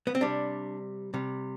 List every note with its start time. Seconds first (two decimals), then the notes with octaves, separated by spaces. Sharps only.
0.07 B3
0.15 C4
0.21 C3 G3 D4
1.14 C3 G3